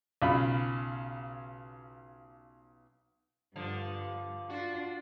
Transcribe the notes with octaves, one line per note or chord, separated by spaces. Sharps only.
B1 C#3 F4 B5
G2 D3 F3 G3
D4 F4 F#4